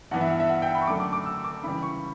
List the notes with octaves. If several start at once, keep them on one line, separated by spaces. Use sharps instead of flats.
G2 E3 B3 F#5
E5
F#5
E5
F#5
G5
B5
C#6
F#2 D3 A3 D6
D6
D6
E6
D6
C#3 E3 G3 B5
C#6